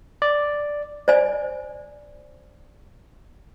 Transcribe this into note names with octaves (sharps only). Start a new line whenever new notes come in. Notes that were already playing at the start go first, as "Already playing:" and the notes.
D5
C5 D5 G#5